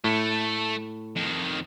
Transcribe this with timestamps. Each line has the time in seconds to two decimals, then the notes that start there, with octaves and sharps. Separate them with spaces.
0.04 A2 A3
1.16 F2 D#3